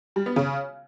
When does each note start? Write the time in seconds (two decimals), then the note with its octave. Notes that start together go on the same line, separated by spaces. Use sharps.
0.16 G3
0.26 B3
0.36 C#3